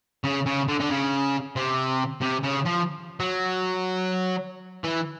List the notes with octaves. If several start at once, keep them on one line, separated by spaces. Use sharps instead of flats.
C#3
C#3
D3
D3
C#3
C3
C3
C#3
F3
F#3
E3